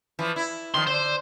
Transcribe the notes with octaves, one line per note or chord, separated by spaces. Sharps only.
E3 F3
E4
D#3 F3 C6
D3 C5